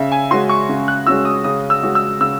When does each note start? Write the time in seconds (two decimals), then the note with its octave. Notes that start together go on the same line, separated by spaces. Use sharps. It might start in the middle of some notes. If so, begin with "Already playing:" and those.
Already playing: C#3 E5
0.12 G#5
0.31 G#3 C#4 F#4 C6
0.49 C#6
0.69 C#3
0.88 F#6
1.07 G#3 C#4 F#4 E6
1.25 D#6
1.44 C#3 D#6
1.70 E6
1.83 G#3 C#4 F#4
1.95 E6
2.20 C#3 E6